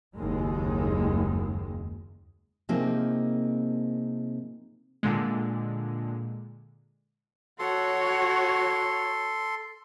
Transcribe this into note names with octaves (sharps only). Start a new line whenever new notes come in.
F#1 D#2 G#3
C3 F3 A#3 C4 D#4 G#4
A#2 D3 G#3
F#4 A4 C#5 C6